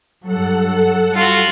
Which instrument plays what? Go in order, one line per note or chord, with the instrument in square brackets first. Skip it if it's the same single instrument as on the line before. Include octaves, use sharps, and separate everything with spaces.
[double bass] G2 F#3 [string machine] A4 F#5
[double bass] G3 [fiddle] F4 F#4